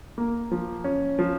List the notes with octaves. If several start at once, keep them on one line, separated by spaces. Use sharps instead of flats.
A#3
F3
C#4
F3